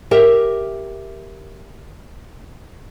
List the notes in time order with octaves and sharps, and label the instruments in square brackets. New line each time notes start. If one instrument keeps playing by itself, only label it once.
[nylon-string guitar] G4 A#4 E5